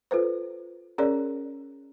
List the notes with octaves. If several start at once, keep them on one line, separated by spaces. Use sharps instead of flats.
F4 A4 B4 C5
C#4 G#4 A#4 C#5 D5